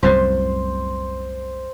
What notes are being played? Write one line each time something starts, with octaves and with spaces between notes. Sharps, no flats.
C2 F#2 A2 C5